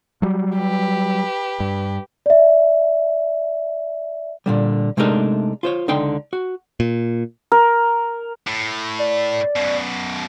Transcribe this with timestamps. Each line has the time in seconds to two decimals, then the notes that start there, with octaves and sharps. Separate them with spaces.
0.22 F#3 G3
0.57 G4 B4
1.60 G2
2.26 D5 E5
4.46 A#2 D3 G3
4.97 C3 G#3 A3 D4 D#4 A#4
5.63 F4 C5 C#5
5.88 C#2 D3 D#4 G5 C6
6.33 F#4
6.80 A#2
7.52 A#4
8.47 A2
8.99 D5
9.56 F#2 B2